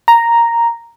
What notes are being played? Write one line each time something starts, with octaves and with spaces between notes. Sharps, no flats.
A#5